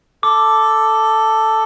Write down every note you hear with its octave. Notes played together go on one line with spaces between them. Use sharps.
A4 D6